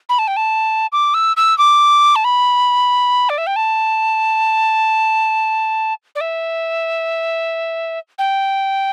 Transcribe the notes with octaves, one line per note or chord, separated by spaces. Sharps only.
B5
A5
G5
A5
D6
E6
E6
D6
A5
B5
D5
E5
G5
A5
D5
E5
G5